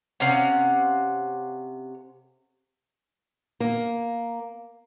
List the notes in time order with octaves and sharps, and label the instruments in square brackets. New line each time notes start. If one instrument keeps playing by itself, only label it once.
[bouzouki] C3 C#4 F5 F#5
[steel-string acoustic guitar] A#3